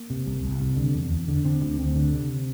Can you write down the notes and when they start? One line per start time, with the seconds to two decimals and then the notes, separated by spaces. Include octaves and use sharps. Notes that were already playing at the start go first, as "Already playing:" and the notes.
Already playing: A#3
0.10 C3
0.26 C2
0.43 C2
0.61 C3
0.77 D3
0.94 E2
1.10 E2
1.28 D3
1.45 D3 C4
1.62 D2
1.78 D2 C4
1.96 D3
2.13 C3